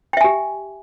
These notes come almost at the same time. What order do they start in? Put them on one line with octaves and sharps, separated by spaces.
G5 E5 G#5 G4